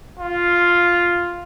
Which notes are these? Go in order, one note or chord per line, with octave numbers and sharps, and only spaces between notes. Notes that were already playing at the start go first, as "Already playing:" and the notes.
F4